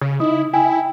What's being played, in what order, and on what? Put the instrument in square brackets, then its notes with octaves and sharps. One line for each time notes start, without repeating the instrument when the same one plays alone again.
[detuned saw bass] C#3
[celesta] D#4 D#5 D#6 [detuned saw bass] E4
[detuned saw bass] E4 [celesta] G5 G#5
[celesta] G5